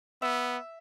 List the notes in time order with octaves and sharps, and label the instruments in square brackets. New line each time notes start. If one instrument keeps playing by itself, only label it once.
[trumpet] B3 [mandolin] E5